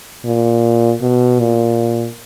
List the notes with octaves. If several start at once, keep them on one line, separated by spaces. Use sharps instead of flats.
A#2
B2
A#2